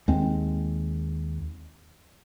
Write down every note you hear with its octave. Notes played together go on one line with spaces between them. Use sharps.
D#2 G#3 C4